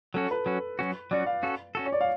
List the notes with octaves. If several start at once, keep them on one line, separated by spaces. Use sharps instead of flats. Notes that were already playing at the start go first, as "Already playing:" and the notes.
F#3 C#4 F#4 A4
B4
F#3 C#4 F#4
F#3 C#4 F#4
F#3 C#4 F#4 D5
F5
C#4 F#4 A4
C#4 F#4 A4
C#5
D5
F5